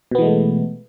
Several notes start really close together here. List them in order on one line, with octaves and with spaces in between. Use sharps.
B2 B3 E3 G#3 A3